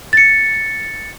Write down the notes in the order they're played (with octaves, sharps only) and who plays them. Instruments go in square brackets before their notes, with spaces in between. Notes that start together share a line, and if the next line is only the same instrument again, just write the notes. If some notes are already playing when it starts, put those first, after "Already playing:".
[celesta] A6 C#7